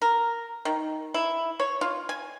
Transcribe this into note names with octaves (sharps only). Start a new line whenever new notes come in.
A#4
D#3
E4
C#5
F4
G#5